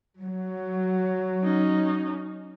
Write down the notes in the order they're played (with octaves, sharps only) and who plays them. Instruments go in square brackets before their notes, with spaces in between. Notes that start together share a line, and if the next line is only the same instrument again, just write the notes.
[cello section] F#3
[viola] C#4 D#4